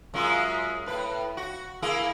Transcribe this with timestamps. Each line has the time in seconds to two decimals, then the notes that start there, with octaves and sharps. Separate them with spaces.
0.14 F#2 G#3 F4
0.86 A2 B4
1.37 F#4
1.82 A#3 E4 G#4